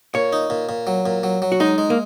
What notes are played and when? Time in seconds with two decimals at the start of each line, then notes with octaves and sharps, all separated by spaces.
0.14 A#2 C#5
0.33 D#4
0.50 A#2
0.69 A#2
0.87 F#3
1.06 A#2
1.23 F#3
1.42 F#3
1.52 F#4
1.60 G#3 D#4
1.78 G#3
1.90 A#3